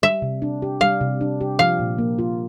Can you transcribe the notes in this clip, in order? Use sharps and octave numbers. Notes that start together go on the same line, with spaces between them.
G3 E5
C3
D4
G4
G3 F5
C3
D4
G4
F3 F5
A#2
A#3
F4